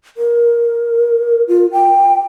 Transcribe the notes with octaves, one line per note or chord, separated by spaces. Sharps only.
A#4
F4
G5